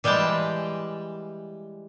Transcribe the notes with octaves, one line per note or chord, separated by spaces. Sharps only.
E3 G3 G#3 G5 A5